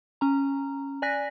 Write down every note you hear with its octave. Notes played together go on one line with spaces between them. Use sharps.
C#4 A#5
D5 G#5 F#6 A#6 B6